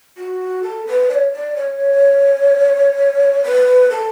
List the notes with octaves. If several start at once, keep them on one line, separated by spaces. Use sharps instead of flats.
F#4
A4
B4
D5
C#5
D5
C#5
B4
A4